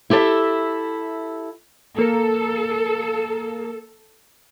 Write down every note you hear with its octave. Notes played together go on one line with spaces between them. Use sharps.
E4 G4 A4 B4 E5
A#3 A4 A#4